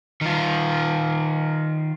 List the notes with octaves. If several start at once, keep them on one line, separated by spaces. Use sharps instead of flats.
D#3 F4